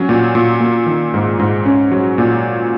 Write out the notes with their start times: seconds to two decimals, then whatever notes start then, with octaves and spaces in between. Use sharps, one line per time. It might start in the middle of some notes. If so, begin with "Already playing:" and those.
Already playing: F#3 C#4
0.09 A#2
0.35 A#2
0.60 A#3
0.86 D#3
1.14 G#2
1.39 G#2
1.65 C#4
1.91 F#3
2.18 A#2